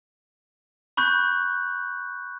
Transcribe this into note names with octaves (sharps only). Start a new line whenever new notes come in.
B5 C#6 F#6 G6